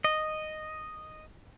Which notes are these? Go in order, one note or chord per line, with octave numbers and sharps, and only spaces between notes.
D#5